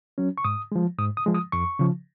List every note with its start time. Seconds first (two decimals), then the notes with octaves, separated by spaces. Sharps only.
0.18 F#3 C#4
0.38 C#6
0.44 G#2 D#6
0.72 F3 G#3
0.99 G#2 D#6
1.17 D#6
1.26 F3 G#3
1.34 D#6
1.52 F2 C#6
1.79 C#3 F3